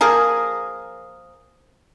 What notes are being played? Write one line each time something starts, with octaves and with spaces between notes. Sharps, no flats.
F3 A#3 G#4 A#4